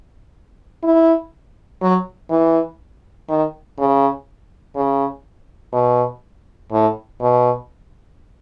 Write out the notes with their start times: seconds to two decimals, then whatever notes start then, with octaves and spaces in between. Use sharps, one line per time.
0.83 E4
1.81 F#3
2.30 E3
3.28 D#3
3.78 C#3
4.75 C#3
5.73 B2
6.72 A2
7.21 B2